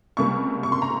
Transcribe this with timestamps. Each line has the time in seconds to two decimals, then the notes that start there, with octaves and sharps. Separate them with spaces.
0.17 C#2 C3 G3 A#3 C#6
0.63 C#6
0.72 C6
0.82 A#5